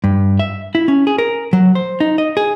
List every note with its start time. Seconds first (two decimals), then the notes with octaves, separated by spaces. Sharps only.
0.04 G2
0.39 E5
0.75 E4
0.88 C#4
1.07 G#4
1.18 A#4
1.53 F#3
1.75 C5
2.00 D#4
2.18 D#5
2.37 G#4